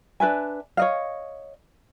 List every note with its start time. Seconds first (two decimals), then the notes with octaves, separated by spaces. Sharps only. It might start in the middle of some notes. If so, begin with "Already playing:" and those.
0.20 D4 B4 E5 G#5
0.77 C#5 D#5 F5